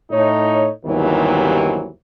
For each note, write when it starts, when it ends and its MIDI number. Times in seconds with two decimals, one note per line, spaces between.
0.11 0.68 45
0.11 0.68 63
0.11 0.68 73
0.85 1.87 31
0.85 1.87 39
0.85 1.87 48
0.85 1.87 51
0.85 1.87 52
0.85 1.87 54